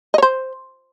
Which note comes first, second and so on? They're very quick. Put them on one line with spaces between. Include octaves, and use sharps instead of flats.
D#5 C#5 C5